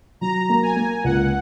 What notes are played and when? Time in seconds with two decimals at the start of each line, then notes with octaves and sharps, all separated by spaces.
0.21 F#3 A#5
0.50 A#3
0.63 G#5
0.76 A#3
1.04 C#2 F#5